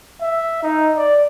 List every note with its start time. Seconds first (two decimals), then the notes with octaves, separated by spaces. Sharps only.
0.22 E5
0.63 D#4
0.97 D5